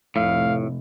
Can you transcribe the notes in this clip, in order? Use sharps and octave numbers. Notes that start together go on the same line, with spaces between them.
F1 A2 F5